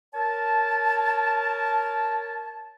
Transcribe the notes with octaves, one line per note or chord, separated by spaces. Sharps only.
A#4 C#5 A5